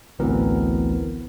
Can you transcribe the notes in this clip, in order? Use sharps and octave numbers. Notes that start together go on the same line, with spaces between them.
A1 D2 E3 B3 C4 A#4